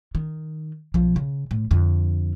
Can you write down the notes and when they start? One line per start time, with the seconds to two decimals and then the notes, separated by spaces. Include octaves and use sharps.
0.15 D#3
0.94 B1 F3
1.16 C#3
1.51 A2
1.71 F2 D3